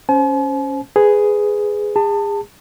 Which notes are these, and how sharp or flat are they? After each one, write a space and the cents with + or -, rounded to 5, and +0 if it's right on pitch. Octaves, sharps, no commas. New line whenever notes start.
C#4 +0 C5 +0 G#5 +45
G#4 +0 B4 +15
G#4 -35 A5 +25